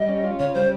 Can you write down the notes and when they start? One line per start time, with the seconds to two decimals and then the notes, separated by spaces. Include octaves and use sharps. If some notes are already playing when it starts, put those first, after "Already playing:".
Already playing: G3 D#5
0.09 C#4
0.24 F4
0.39 C#3 C#5
0.54 G3 C5